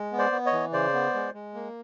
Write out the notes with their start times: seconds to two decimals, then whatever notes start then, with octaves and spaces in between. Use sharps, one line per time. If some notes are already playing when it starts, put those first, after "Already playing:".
Already playing: G#3
0.12 B3
0.18 C5 D5
0.32 B3
0.46 C#5 D#5
0.52 E3
0.73 C#3 C5 D5
0.94 B3
1.14 G#3
1.34 G#3
1.54 A#3